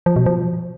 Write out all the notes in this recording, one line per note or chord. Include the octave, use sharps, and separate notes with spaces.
F3
B2
F3